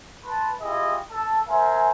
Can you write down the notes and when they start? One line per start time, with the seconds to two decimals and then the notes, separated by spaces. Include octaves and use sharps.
0.25 B4 A5 C6
0.62 E4 F4 G4 G#4 D#5
1.12 A4 A5
1.48 A#4 C5 E5 G#5